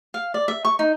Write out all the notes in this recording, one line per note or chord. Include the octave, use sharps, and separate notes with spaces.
F5
D5
E5
C#6
D#4